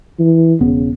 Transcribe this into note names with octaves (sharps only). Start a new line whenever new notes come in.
E3
E1 C#3 B3